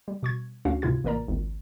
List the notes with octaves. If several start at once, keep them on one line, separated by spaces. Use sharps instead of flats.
G3
B2 C#6 G#6
D2 C#4 D4 F#4 F5
C#2 G#2 C3 E4 F4 G#6
A1 A#3 A#4 D5 A#5
G#1 C#2